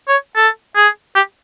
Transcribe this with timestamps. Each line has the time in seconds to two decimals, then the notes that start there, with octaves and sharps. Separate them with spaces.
0.09 C#5
0.36 A4
0.76 G#4
1.16 G4